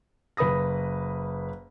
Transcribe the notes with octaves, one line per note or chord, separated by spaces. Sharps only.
F#1 B4 B5 D#6 A#6